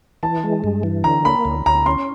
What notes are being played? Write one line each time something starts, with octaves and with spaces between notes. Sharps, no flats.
E3 A5
G#3
G2
E3
D3 A#5
A#3 B5
D2
D2 A#5
C#4 C6